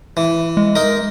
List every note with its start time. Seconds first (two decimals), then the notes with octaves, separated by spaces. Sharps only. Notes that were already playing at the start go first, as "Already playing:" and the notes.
0.17 E3
0.57 G#3
0.76 D#4 A#4